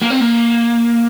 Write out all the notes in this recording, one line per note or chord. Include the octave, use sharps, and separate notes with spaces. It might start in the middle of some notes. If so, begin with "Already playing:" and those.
A#3
C4
A#3